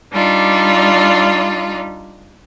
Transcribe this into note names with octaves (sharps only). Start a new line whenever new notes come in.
G3 D4 D#4 F4